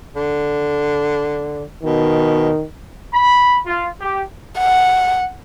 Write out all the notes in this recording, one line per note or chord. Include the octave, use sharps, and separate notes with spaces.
D3
B2 D#3
B5
F4
G4
F#5